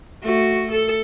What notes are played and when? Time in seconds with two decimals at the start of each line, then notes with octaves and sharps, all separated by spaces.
0.23 A3 F#4
0.71 A4